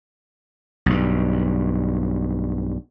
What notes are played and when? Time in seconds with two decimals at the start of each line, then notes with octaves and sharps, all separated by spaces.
0.86 B1 G2